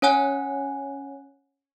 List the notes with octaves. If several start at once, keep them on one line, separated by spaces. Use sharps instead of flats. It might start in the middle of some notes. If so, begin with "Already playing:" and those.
C#4 C#5 F#5 G#5 F#6